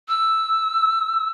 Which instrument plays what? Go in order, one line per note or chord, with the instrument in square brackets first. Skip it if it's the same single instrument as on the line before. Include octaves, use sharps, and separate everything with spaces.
[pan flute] E6